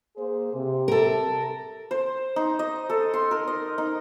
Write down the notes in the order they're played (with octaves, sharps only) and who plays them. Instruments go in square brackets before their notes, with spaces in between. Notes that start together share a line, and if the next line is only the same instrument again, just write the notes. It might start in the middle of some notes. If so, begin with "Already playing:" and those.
[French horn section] A#3 G#4 C5
C3
[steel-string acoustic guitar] A4 A#4
[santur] C5
D#4
D#5
A4
C6
A#4
D#5
D#4